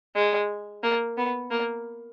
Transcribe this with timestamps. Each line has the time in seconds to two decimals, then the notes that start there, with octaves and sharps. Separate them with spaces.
0.15 G#3
0.83 A#3
1.17 B3
1.51 A#3